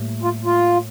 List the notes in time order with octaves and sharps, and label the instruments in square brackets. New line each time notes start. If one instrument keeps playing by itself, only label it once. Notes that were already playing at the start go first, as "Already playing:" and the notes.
Already playing: [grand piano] A2 G3 A#3
[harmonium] F4
F4